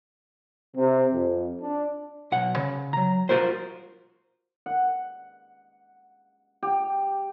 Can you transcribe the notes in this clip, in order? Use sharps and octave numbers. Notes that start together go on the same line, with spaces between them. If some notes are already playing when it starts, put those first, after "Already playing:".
C3
F2
D4
B1 F#5
C#3
F#3 A#5
F4 F#4 A#4 C5
F#5
G4